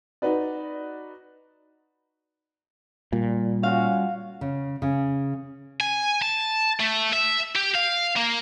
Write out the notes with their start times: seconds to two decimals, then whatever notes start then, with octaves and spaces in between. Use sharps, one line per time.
0.22 D#4 F#4 B4 D5
3.12 A#2 G3
3.63 C#4 F4 F#4 F5
4.41 C#3
4.82 C#3
5.81 G#5
6.22 A5
6.80 A3
7.13 E5
7.56 G4
7.75 F5
8.16 A#3